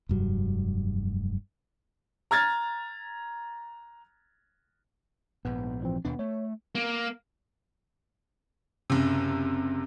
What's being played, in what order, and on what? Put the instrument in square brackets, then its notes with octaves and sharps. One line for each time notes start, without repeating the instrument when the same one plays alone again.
[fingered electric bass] F1 G2 F#3
[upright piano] A#5 F6 G#6 A6
[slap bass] A#1 G#2 [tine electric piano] B3
[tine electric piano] E3 F3 C4
[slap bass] D#2 B2 D4 [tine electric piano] B3
[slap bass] A3 [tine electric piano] C#5
[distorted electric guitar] A#3
[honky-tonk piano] F#1 C3